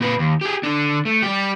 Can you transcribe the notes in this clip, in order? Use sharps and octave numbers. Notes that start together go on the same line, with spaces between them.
A#2 B4
D#2
G4 G#4
D3 D4
A3
G3 G4